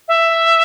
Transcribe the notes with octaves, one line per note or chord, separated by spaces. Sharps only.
E5